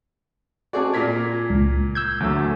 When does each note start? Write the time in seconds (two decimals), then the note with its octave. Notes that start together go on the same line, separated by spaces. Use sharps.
0.73 C4 F#4 G#4 D5 A5
0.94 A#2 A#4 G#6 B6
1.50 C#2
1.95 E6 G6 G#6
2.20 D2 F#3 A3